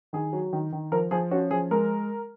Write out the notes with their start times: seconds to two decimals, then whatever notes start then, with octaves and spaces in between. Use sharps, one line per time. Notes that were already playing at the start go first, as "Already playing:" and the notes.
0.13 D#3 G#4
0.33 F#3
0.53 D#3
0.72 D#3
0.92 F3 A#4
1.11 F3 G#4
1.31 C#4 F#4
1.51 F3 G#4
1.71 G#3 A#4